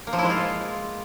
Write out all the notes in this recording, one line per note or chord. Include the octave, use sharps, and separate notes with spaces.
A#3
F3
E4
G#3
F4